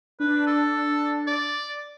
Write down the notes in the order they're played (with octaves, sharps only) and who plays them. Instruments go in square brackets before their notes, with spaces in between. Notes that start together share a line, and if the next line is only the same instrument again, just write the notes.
[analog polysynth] D4 [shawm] B4
[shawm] A4
D5